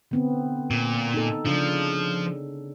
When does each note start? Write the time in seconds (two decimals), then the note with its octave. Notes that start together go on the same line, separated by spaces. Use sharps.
0.11 D3 B3 C4
0.71 A#2
1.14 D#4 A4
1.45 C#3 F3 D4